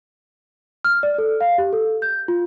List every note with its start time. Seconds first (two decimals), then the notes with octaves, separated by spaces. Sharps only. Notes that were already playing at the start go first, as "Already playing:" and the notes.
0.85 F6
1.03 D5
1.18 A4
1.41 F5
1.58 G4
1.73 A4
2.02 G6
2.28 F4